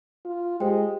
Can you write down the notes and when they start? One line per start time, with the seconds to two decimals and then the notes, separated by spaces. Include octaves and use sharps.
0.25 F4
0.60 G#3 G4 C5 G5